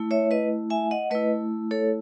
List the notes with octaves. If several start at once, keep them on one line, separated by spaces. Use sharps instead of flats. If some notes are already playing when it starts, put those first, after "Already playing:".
Already playing: A3 E4
C#5 E5
B4 D#5
E5 G#5
D#5 F#5
A3 E4 B4 D#5
A4 C#5